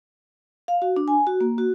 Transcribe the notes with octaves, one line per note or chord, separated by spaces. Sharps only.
F5
F#4
D4
G#5
F#4
A#3
F#4